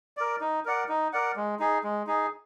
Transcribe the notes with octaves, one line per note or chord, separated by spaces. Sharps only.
A#4 D5
D#4
A#4 D5 F#5
D#4
A#4 D5 F#5
G#3
D#4 G#4
G#3
D#4 G#4